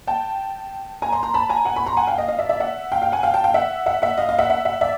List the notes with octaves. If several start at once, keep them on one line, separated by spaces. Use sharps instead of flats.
G5 A5
G#5 A#5
A#5 C6
A#5 C6
A5 B5
G#5 A#5
F#5 G#5
B5 C#6
A#5 C6
F#5 G#5
F5 G5
D#5 F5
D#5 F5
D5 E5
D5 E5
E5 F#5
F5 G5
F5 G5
F#5 G#5
F5 G5
G5 A5
F5 G5
E5 F#5
E5 F#5
E5 F#5
D#5 F5
D#5 F5
E5 F#5
E5 F#5
E5 F#5
D5 E5